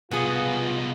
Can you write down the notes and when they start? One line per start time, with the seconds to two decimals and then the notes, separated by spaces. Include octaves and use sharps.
0.11 C2 B2 B3 F4 G#4